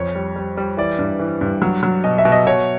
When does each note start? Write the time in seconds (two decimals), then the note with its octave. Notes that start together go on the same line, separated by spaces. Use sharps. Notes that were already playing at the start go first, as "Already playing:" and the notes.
Already playing: F2 C#5
0.15 G3
0.36 G3
0.57 G3
0.77 E3 D5
0.99 G2
1.19 E3
1.41 G2
1.62 F#3
1.83 F#3
2.04 B2 D#5
2.18 E5
2.25 B2
2.32 D#5
2.47 B2 C#5